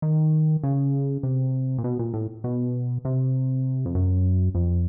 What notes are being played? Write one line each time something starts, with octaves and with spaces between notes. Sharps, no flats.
D#3
C#3
C3
A#2
B2
A#2
A2
B2
C3
F2
F#2
F2